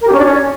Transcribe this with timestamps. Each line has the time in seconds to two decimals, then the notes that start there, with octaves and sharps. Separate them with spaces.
0.01 A#4
0.07 G4
0.12 C#4
0.18 D4
0.24 C#4